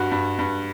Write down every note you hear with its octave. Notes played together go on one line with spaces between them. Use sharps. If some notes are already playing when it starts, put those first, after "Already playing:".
Already playing: G2 F#4
G2
G2